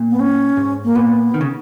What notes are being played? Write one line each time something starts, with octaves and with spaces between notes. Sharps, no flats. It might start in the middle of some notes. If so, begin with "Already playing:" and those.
Already playing: A#2
B3
C#4
G#2
A#3
A#2 B3
D#3
C#3